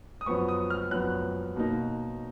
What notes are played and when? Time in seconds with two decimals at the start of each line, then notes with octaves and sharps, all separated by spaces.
0.21 D#6
0.26 F#2 F3 B3 C#6
0.49 D#6
0.70 F6
0.91 F#2 F3 B3 F#6
1.56 B2 A#3 D#4